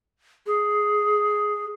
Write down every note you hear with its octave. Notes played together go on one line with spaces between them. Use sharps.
G#4